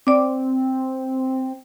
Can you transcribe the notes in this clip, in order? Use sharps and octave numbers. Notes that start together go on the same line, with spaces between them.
C4 D5 D6